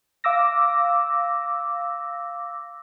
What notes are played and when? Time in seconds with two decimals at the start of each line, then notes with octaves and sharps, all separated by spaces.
0.24 F5 D6 E6 A#6